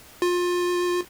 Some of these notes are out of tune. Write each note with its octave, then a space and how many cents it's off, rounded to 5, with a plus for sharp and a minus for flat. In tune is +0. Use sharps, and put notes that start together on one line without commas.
F4 +25